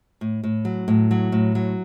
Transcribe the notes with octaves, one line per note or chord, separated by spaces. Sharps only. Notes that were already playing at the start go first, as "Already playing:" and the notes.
A2
A2
F#3
A2
F#3
A2
F#3